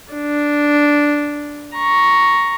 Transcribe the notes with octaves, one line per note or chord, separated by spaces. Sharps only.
D4
A#5 C#6